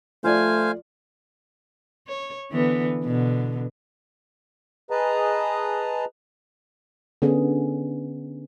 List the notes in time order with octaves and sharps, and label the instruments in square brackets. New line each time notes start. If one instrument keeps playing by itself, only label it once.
[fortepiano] F3 F4 D5 [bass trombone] A3 [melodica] C5 F5 [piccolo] G#5
[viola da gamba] C#5
D3 E3 B3
B2 D3
[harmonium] G#4 B4 D#5 A5 A#5
[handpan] D3 B3 C#4 G#4